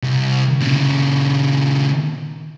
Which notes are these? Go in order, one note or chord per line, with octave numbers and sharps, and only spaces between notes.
C2
A#2 C#3